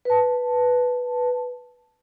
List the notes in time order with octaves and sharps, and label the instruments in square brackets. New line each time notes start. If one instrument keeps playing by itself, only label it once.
[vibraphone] B4 A5